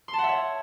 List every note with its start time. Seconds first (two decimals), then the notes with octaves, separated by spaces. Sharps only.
0.08 C6
0.13 A5
0.18 F#5
0.24 E5
0.29 C#5